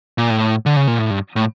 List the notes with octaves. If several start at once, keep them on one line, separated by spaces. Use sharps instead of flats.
A#2
A2
D3
C#3
A#2
A2
G2
A2